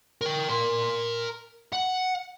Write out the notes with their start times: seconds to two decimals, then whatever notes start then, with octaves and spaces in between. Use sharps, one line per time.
0.21 A#4 G5
0.50 A#4 C6
1.73 F#5